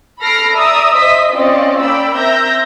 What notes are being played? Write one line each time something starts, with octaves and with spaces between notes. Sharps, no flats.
A4 B5 F6 A#6 C7 D7
D5 E5 A#5 D#6 E6
C5 D#5 E5 D#6 B6
C4 C#4 F4 C5 D5 D#5
A#3 D5 G5 B5 E6
C4 A#4 E5 E6 G6 A#6